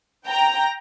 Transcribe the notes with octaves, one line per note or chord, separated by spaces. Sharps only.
G5 A#5